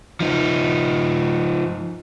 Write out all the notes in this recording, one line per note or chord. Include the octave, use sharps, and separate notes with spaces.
F3 D#4